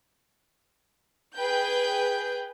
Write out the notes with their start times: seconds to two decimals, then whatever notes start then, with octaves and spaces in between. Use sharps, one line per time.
1.36 G#4 B4 G5 G6